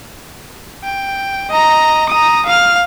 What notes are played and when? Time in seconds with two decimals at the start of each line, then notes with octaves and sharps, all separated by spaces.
0.84 G5
1.50 D#5 A#5
2.09 A#5 D#6
2.46 F5 F6